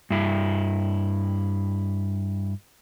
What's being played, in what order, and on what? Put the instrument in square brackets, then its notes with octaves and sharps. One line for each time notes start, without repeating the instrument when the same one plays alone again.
[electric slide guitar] G2 E4